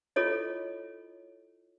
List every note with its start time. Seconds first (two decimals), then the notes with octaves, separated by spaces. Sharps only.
0.16 E4 F4 A4 C#5 D#5